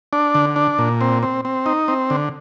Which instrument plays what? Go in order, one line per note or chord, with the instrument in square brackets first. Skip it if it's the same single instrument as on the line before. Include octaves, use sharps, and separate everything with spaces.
[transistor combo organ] D4
D3
D4
A#2
C4
C4
C4
D#4
C4
D3